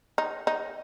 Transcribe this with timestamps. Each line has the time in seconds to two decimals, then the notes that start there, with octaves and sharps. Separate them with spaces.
0.18 D#4
0.47 D#4